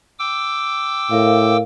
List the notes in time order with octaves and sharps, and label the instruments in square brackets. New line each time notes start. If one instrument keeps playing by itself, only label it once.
[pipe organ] G5 D6 E6
[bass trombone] A2 [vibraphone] A#4 F5